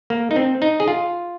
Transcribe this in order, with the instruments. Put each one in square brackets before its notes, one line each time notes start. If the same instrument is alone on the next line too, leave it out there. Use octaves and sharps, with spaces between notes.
[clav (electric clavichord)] A#3
D#4
C4
D#4
G#4
F4